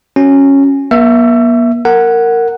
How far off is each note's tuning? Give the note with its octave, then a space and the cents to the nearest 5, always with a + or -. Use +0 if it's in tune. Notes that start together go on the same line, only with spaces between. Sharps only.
C#4 -10 F#4 +0
A#3 +45 E5 +5 E6 +35
A#4 -15 F#5 +0